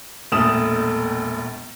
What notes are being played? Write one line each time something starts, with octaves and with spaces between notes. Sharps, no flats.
E1 A#1 A3 A4 D#6 E7